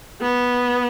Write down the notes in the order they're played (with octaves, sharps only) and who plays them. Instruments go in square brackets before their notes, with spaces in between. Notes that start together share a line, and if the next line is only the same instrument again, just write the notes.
[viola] B3